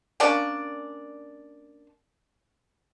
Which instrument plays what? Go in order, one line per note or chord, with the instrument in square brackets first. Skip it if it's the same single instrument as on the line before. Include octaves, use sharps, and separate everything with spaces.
[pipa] A#3 C#4 D4 D5